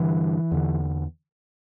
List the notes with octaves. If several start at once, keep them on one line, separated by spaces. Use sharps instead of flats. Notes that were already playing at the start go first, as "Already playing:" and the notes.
Already playing: G2 D3 E3
E2 D3